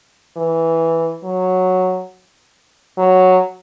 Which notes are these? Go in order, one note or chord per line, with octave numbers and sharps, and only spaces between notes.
E3
F#3
F#3